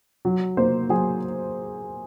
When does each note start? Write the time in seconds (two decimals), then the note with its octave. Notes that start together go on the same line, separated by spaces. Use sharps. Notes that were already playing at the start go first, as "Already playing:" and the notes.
0.25 F#3
0.57 A#3 C5
0.89 F#3 G#4